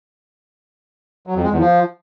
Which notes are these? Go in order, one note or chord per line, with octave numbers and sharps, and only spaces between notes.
F#3
F2
G#3
E2
F3